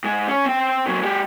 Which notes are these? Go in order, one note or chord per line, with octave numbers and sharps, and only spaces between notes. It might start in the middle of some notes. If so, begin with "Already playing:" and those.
G#2 G#3
C#4 C#5
C4 G5
A#2 F#3
G#3 G4